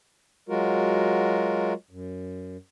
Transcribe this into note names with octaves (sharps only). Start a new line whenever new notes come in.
F#3 G#3 F4 F#4 A#4
F#2